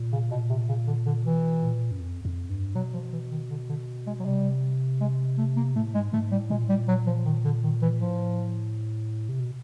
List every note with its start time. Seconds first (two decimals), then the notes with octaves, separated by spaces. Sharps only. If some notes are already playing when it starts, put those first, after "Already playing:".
Already playing: A#2
0.12 C#3
0.31 B2
0.50 C3
0.68 C#3
0.87 D3
1.06 D3
1.24 B2 E3
1.62 A#2
1.91 F#2
2.00 F2
2.25 F2
2.50 G2
2.75 B2 F#3
2.94 F3
3.12 E3
3.31 D#3
3.50 D3
3.69 D3
4.07 G#3
4.20 F#3
4.25 C3 G3
5.01 G#3
5.38 A3
5.57 A#3
5.75 A2 A3
5.94 G#2 G#3
6.13 G#2 A3
6.32 A2 G3
6.50 A#2 G#3
6.64 A2
6.69 G3
6.77 A#2
6.88 F#3
7.07 F3
7.26 D#3
7.45 D3
7.64 D#3
7.82 E3
8.01 A2 F3
9.29 C3
9.40 B2